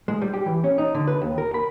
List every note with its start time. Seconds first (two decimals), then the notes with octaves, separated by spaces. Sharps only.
0.08 G#3
0.22 G3
0.34 G4
0.46 E3
0.64 C#4
0.78 D#4
0.95 D3
1.07 B4
1.22 D#2
1.38 A#4
1.54 B5